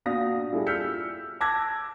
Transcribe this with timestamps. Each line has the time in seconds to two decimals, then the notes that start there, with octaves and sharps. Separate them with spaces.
0.06 A#2 D4 F#4 F5 D#6 A#6
0.52 G3 D4 E4 F4 G#4 A4
0.66 E6 F6 G6 B6 C#7
1.40 A5 D6 E6 F#6 G#6 A#6